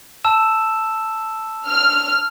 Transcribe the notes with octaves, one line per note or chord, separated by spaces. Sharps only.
A5 E6 E7
F6